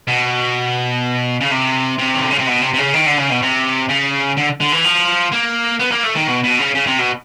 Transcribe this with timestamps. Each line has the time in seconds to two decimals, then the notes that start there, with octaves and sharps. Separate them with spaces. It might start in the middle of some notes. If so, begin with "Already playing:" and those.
0.08 B2
1.40 C#3
1.51 C3
1.98 C3
2.14 D#3
2.22 D3
2.31 C#3
2.38 C3
2.46 B2
2.62 C3
2.73 C3
2.78 C#3
2.94 D#3
3.06 D3
3.18 C#3
3.30 B2
3.42 C3
3.89 C#3
4.37 D3
4.60 D3
4.72 E3
4.84 F3
5.32 A#3
5.79 B3
5.91 A#3
6.03 A3
6.15 D#3
6.27 B2
6.43 B2
6.59 C#3
6.75 C#3
6.86 C3
6.98 B2